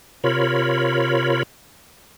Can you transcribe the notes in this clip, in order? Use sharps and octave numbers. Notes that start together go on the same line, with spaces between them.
C3 F4 A#4 C#5 B5